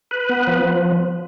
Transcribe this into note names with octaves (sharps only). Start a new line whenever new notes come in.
B4
B3
F3